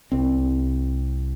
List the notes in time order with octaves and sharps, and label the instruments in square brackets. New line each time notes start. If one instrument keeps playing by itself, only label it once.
[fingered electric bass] C2 C4